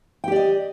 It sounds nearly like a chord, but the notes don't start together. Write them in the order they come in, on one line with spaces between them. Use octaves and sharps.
G5 G4 D5 D#5